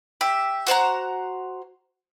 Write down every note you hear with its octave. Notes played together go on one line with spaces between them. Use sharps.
G4 E5
F#4 C5 F#5 A#5